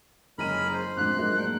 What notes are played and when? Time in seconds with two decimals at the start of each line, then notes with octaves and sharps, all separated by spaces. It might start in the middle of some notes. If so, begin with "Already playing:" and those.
0.38 F#1 G#3 C#4 A#4 B5 D#7
0.73 C5
0.97 F2 G#2 D4 F#6
1.15 G#2 F#3 G#3 D4 A#4
1.36 A3 A#3 D5